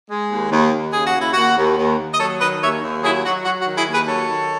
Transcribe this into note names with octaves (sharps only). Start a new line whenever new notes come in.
G#3
D#2
D#2
D#2
C#3 G#4
F#4
D#2
E4
D#2 F#4
D#2
D#2
D#2
D#5
F#3 A4 C#5
D#3 B4 D#5
D#2 C#5 E5
D#2
F#3 E4 G#4
F#3 F#4
F#3 F#4
F#4
D#3
E4 G#4
D#2
G#4 B4
F#3 A4 C#5
D#3